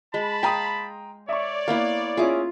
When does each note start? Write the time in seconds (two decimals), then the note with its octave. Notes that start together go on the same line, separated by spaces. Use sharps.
0.14 G#3 A5 B5
0.43 F5 G5 A#5 C6 D#6
1.29 C#5 D5 E5 C#6
1.68 A#3 B3 E4 F5
2.17 C#4 E4 F4 G#4 D6